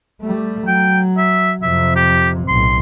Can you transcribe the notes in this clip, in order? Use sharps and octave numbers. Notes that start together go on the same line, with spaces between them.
G3 A3
F#3 G5
E5
F2 C3 E5
G4
B1 A2 C6